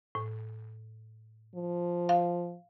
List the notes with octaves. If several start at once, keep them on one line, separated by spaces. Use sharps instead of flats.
A2
F3
F5